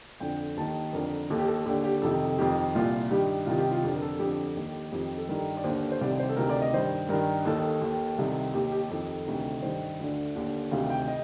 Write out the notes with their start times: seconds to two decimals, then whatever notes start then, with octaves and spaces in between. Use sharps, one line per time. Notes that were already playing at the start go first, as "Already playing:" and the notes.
0.20 F2 D3 G5
0.57 D#2 D#3 A5
0.93 F2 D3 A#4
1.30 D#2 D#3 A4
1.38 G4
1.47 A4
1.66 D#2 D3 G4
1.84 G4
2.02 F2 C3 D#3 A4
2.38 F2 D#3 G4
2.75 C2 A#2 F4
3.11 G2 D#3 G4
3.47 C2 C3 D#3 F4
3.59 G4
3.71 F4
3.83 F2 D3 G4
3.95 A#4
4.02 A4
4.19 F2 D3 G4
4.56 D#2 D#3
4.92 F2 D#3 G4
5.18 A4
5.29 G2 D#3 A#4
5.57 D5
5.64 D#2 D3 C5
5.92 C5
6.01 C2 C3 D#3 D5
6.19 C5
6.29 A4
6.36 D2 C3 D#3 A#4
6.50 D5
6.62 D#5
6.73 G2 D#3 C5
7.09 G2 D#3 A#4
7.45 D#2 D#3 A4
7.81 D#2 D#3
8.18 C2 C3 D#3
8.54 D#2 D#3 G4
8.72 G4
8.90 F2 D#3 A4
9.27 D2 C3 D#3
9.62 G2 D#3 C5
10.00 D2 D3
10.36 D#2 D3
10.71 D2 C3 D#3 F5
10.90 G5
11.08 D#5